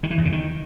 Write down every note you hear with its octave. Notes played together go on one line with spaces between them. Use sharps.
D#3
E3
E2
C#3
D#3